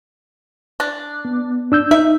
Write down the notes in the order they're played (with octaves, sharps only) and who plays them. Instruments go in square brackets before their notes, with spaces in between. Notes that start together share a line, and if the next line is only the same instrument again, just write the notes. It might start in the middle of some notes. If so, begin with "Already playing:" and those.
[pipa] D4
[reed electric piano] B3
D4 E6 G6
[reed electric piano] D#4 [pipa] E5